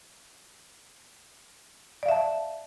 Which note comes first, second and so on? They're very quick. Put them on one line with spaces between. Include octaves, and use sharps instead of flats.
D5 F5 E5 A5